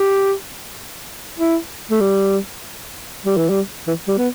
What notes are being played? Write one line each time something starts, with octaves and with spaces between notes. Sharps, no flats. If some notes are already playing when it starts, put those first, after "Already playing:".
Already playing: G4
E4
A3
G3
G3
E3
G3
E3
G3
B3